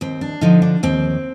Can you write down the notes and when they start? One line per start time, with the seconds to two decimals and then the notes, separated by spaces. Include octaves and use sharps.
0.01 D#2 C4
0.21 D4
0.41 D3 F3 D#4
0.62 D4
0.83 D#2 C4